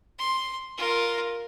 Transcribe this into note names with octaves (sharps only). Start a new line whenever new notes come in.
C6
F4 A#4